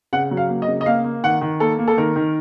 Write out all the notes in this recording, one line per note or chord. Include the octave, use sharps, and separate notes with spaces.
C#3 F#5
F#3
F5
A#3
D#5
C#3
D#5
A#3 F5
A#3
D#3 F#5
D#3
A#3 A4
A#3
A4
D#3 A#4
D#3